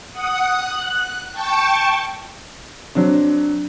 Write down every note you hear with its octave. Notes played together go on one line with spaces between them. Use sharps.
F#5 D#6
F#6
G5 A5 C#6
F#3 C4 D4